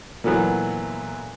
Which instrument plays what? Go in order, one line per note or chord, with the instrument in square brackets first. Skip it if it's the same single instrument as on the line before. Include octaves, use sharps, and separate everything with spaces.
[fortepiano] A#2 D3 E3 F#3 B3